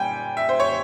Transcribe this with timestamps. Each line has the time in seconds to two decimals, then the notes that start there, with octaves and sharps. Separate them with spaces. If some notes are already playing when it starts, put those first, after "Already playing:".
Already playing: A#2 G3 G5 G#5
0.37 E5
0.49 C5
0.60 C#5